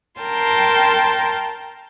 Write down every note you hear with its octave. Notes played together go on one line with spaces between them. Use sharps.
A#4 G5 A5 C6